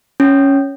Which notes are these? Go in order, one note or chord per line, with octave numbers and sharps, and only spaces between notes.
C#4